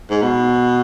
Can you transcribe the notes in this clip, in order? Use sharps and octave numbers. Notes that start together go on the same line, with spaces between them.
G#2
B2